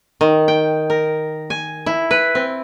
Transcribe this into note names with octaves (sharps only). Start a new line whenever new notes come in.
D#3
G5
A#4
G#5
E4
B4
C4